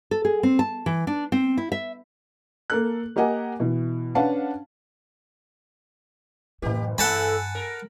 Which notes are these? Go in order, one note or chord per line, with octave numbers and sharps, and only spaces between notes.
A4
G#4
C4
A5
E3
D4
C4
E4
E5
A#3 A4 F#6
A#3 G4 A#4 D#5 F#5 G#5
B2 E3
C#4 D4 B4 F5 F#5 A5
F#1 A2 E3 F#3 G4
E2 G2 A4 F#5 G#5 A5 B5
A#4